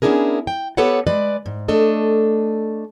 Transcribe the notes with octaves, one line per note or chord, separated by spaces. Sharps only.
B3 C#4 D4 E4 G#4 A#4
G5
B3 G4 A4 B4 C#5 F#5
G#3 B4 D5
G#2
A3 D4 A4 D#5